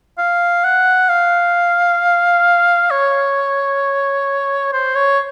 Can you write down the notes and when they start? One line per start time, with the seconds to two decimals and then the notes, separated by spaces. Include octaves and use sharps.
0.18 F5
0.64 F#5
1.09 F5
2.91 C#5
4.73 C5
4.95 C#5